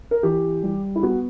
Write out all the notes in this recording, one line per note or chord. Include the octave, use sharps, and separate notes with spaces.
A#4
E3 G4
G3
E4
B3 F#4